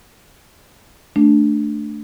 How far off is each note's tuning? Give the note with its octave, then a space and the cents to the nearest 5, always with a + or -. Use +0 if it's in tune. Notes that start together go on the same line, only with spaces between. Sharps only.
A3 +0 D4 +0